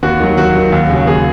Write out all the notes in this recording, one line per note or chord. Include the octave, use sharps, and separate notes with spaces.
D#2 F#4
D#3 F#3
D#2 F#4
D#3 F#3
D#2
C#3 F#3
D#2 G#4